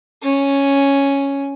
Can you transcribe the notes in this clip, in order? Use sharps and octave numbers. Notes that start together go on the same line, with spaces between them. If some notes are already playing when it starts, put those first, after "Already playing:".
C#4